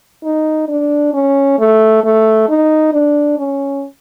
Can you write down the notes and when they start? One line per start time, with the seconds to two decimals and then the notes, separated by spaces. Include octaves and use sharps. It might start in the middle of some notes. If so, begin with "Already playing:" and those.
0.24 D#4
0.68 D4
1.14 C#4
1.59 A3
2.04 A3
2.49 D#4
2.93 D4
3.38 C#4